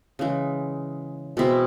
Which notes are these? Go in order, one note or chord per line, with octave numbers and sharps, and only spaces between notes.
C#3 E3 G#3
B2 G#3 C4 E4